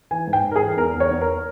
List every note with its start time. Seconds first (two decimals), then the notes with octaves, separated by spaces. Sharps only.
0.11 E3 G#5
0.27 G#2
0.33 G5
0.44 G#2
0.51 A#4
0.56 G#4
0.61 E3
0.77 E2 A#4
0.95 E2
1.00 C#5
1.11 E2
1.21 A#4